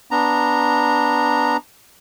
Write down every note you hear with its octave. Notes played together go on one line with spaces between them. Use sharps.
B3 D4 A#5